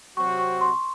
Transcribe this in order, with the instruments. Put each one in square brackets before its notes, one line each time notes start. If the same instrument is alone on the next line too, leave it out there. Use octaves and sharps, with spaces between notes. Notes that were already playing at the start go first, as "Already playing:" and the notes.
[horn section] C3 F#3 C4 F#4 [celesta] C#6
[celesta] C#6
C6